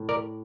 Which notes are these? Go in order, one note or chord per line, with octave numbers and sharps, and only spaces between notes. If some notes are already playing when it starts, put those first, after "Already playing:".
Already playing: A2
A#4 D5